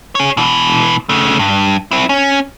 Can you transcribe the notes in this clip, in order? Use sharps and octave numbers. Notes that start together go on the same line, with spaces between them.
G#4 C#5
B2 E3
C#3 A3
G2
C4 E4
C#4